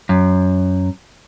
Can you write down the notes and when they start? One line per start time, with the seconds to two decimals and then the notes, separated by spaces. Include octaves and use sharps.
0.09 F#2